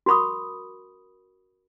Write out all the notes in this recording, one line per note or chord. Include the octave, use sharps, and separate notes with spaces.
F#4 A#4 B5 C#6 D#6